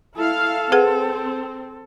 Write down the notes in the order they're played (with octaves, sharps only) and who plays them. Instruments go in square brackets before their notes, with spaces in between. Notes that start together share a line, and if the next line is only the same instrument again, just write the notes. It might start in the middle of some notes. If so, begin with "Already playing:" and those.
[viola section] E4 F5 [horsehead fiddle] A4
[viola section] C4 [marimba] G#4 B4 F#5